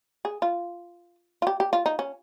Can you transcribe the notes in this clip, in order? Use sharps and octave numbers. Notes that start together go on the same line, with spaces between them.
G#4
F4
F4
G4
G4
F4
D#4
C#4